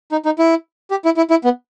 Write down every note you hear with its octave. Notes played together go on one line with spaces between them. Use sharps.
D#4
D#4
E4
G4
E4
E4
E4
B3